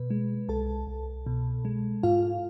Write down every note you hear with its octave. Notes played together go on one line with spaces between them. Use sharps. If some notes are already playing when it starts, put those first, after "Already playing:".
Already playing: B2 B4
G#3
C2 A4 A5
C2
B2
G#3
G#2 F4 F5